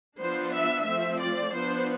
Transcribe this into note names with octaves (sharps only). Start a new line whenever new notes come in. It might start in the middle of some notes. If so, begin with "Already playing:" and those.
F3 B3 D4 C5
E5
F3 A3 C4 E5
D5
F3 B3 D4 C5